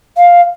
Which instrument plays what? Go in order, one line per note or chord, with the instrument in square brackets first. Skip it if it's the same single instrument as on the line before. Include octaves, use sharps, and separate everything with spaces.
[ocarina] F5